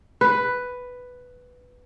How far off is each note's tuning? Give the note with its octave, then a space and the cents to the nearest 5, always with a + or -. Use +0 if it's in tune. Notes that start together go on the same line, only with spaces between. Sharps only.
B4 +5